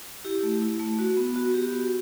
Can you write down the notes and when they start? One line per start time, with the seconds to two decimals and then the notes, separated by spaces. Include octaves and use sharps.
0.25 E4 G4
0.43 A3
0.62 E4
0.80 A3
0.98 F#4
1.17 B3
1.36 F#4
1.54 B3 G4
1.73 F#4